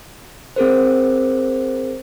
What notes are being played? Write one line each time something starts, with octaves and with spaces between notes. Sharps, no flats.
C4 G#4 A#4 C5